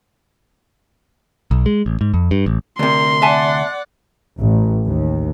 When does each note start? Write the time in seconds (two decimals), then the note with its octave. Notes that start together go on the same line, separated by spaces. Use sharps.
1.51 B1
1.66 G#3
1.86 A1
2.01 G#2
2.14 F2
2.31 G2
2.46 A1
2.79 D2 C3 A#4 C6
3.22 D5 E5 F#5 G#5 A5
4.40 A1
4.87 D#2